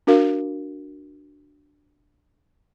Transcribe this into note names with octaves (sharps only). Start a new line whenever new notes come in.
D4 F#4 A#4 F5